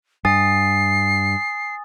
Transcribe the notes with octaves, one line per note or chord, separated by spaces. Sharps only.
G2 G#5 D#6 A6 C7